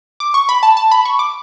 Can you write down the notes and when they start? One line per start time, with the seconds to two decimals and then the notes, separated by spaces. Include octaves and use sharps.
0.20 D6
0.34 C#6
0.49 B5
0.63 A5
0.77 A5
0.91 B5
1.05 C#6
1.19 D6